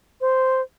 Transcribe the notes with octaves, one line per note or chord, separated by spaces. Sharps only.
C5